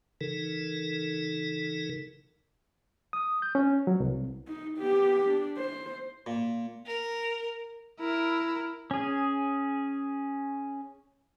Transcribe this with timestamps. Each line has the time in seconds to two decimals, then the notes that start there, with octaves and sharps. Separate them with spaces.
0.21 C#3 E3 D#4 A4 A#4
3.13 D#6
3.42 G6
3.55 C#4
3.87 F#3
4.00 C2
4.47 D#4
4.78 B3 G4
5.27 D4
5.57 C5
6.26 A#2
6.86 A#4
8.00 E4 A#4
8.91 C#4 G#4